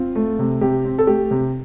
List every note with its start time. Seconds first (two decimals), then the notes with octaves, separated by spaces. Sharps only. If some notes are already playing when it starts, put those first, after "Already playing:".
Already playing: C4 F4
0.16 A3
0.39 C3
0.61 C3 G4
0.85 C4
0.98 A4
1.07 A3 G4
1.31 C3